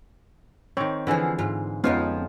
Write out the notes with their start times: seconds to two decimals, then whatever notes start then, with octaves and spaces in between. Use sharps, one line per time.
0.77 D#3 C4 C#5
1.07 D3 E3 F3 B3 G#4
1.39 G#2 F4
1.84 F2 F3 G#3 B3 C#4 D#4 F4